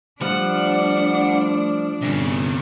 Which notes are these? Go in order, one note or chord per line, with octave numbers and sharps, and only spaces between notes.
F3 G3 A3 D4 F#5
G1 C3 C#4